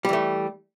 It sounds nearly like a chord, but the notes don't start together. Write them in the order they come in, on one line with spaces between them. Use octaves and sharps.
G3 E3 A3